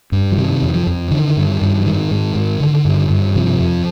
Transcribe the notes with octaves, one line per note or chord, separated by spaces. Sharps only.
G2
F3
C3 D#3
F2
F3
F2
D3 D#3
G2
G2
F3
G#2 D#3
G#2
G#2
D3
G2
G2
C3 F3
F2